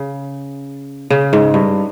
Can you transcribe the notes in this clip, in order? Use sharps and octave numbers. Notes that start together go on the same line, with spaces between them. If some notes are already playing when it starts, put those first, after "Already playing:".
Already playing: C#3
C#3
G#2
G2